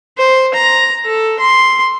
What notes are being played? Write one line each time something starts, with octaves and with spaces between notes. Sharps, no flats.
C5
A#5
A4
C6